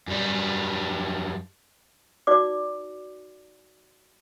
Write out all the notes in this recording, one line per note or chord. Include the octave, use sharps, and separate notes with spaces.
F#2 G3
D#4 F#4 D5 D6